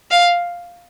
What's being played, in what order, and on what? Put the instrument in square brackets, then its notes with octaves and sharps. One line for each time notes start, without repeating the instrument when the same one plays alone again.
[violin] F5